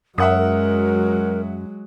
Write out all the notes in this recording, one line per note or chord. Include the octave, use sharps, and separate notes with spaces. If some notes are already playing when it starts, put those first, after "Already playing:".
F#2 F#3 G#3 A#4 E5 F#5 D#6